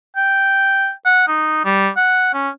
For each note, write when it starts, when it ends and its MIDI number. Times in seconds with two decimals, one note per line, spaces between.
0.17 0.91 79
1.06 1.24 78
1.28 1.64 63
1.65 1.89 55
1.97 2.34 78
2.34 2.49 61